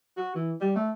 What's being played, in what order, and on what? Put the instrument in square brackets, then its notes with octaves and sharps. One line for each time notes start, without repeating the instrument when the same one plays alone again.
[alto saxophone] F#4
E3
G3
A3